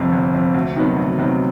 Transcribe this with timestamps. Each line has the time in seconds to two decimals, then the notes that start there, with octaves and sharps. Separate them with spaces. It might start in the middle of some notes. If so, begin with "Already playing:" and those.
Already playing: G1 F2 C3
0.12 G1
0.33 F2 C3
0.54 D2
0.75 C3 D#3 F#3 B3
0.96 D2
1.18 C3 D#3 F#3 B3